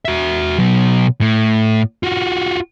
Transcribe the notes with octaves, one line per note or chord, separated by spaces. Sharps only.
F#4 E5
B2 F#3
A2
F4 F#4